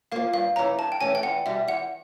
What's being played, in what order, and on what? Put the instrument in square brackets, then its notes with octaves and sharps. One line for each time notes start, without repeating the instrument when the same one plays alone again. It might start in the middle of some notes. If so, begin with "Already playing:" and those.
[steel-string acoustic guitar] F3 A#3 [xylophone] F5
[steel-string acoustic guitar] G2 [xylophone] F5
[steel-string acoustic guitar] E3 A3 C#4 [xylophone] A#5
[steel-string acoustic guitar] G2 [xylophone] A5
[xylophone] G5
[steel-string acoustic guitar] E3 A3 C#4 [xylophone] G#5
[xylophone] G5
[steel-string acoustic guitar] E2 [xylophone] F#5
[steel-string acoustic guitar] B2 G3 [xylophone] E5
[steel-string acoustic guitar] E2 [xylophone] F#5